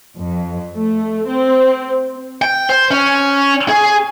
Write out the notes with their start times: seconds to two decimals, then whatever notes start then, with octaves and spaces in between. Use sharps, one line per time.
0.17 F2
0.75 A3
1.28 C4
2.42 G5
2.70 C5
2.91 C#4
3.69 G#4